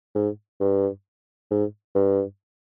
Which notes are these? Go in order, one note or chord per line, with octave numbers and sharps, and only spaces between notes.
G#2
G2
G#2
G2